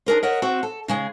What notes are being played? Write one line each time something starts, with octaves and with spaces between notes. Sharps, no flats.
D4 G#4 A#4 C5
A#4 C#5 D#5 E5 F#5
C4 F#4 E5
A4
C#3 G#3 G#4